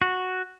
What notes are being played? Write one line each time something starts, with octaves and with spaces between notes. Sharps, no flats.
F#4